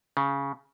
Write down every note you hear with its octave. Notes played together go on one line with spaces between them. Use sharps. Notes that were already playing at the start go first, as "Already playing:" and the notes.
C#3